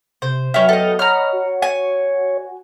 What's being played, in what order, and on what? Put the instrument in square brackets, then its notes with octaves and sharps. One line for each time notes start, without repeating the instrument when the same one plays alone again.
[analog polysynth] C3 [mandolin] C5
[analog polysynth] F#3 B3 F#4 [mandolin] C#4 E4 [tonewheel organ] G5 F6
[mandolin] A4 D#5
[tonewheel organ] C#5 [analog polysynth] D#5 F#5 B5 [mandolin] A#5 F6
[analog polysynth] F#4
[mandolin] G#5